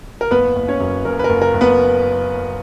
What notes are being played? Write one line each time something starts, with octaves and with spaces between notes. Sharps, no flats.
A#4
F#1 B3 B4
F#1
C#4 C#5
F#2
F#1 A#4
B4
A#4
F#1
A#4
F#1
B3 B4